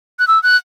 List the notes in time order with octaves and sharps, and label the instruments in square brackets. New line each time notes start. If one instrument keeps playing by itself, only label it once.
[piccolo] F#6
E6
F#6